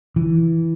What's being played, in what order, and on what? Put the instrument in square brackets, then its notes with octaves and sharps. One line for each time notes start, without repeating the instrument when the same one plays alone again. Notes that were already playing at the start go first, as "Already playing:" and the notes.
[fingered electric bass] E3